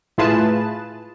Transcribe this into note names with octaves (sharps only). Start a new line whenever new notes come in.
A2 E4 F4 G#4 B4 A5